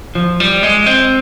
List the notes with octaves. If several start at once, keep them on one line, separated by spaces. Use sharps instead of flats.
F3
G3
G#3
C4